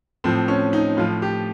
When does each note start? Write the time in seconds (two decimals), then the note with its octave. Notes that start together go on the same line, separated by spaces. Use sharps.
0.24 A2 F3 C4
0.48 C#4
0.73 D#4
0.97 A2 F3 F4
1.22 G4